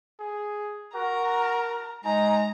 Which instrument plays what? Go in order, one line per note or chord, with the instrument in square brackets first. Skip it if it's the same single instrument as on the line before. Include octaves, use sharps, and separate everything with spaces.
[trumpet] G#4
[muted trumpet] F#4 [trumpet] A#4 [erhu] A#5
[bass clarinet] G#3 [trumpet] D#4 [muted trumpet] G#5 [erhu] A#5